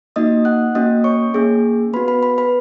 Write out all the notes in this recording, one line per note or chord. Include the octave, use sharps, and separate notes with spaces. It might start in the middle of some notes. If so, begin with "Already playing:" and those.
A#3 D#4 F#4 D#5 D#6
F#5 F#6
A#3 C#4 F#4 D#5 D#6
C#5 C#6
A#3 C#4 G#4
B3 F#4 B4 B5
B4 B5
B4 B5
B4 B5